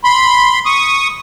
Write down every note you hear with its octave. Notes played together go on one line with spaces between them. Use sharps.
B5 C6
C#6 D#6